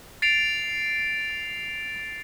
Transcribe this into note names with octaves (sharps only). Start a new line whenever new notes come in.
A6 C7 D7 F7